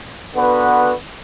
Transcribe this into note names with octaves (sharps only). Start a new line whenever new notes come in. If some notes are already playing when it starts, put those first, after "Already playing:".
D3 B3 F#4 B4